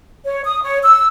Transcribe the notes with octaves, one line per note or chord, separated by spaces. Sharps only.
C#5
D#6
C#5
E6